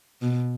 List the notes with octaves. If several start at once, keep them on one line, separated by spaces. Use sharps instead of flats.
B2